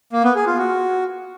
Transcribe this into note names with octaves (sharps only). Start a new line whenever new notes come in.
A#3
B3
G#4
F4
F#4